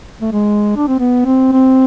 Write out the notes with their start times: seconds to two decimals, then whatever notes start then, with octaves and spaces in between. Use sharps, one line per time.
0.21 A3
0.33 G#3
0.76 D4
0.88 C4
0.99 B3
1.26 C4
1.52 C4